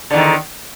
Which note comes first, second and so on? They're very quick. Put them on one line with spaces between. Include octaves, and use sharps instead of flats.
D3 E2 D#3